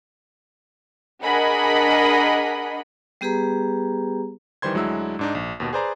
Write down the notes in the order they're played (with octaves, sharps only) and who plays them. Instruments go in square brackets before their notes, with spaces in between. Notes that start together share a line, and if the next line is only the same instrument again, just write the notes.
[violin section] D4 G#4 A#4 D#5 F#5 B5
[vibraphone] G3 B3 G4 G#4 B4 A#5
[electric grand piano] D#3 E3 G3 C5 C6 G#6
D2 F#3 G#3 D4 E4 E6
G#2 D4 D#4
A#1
D#2 B2
G#4 B4 C5 D5 A#5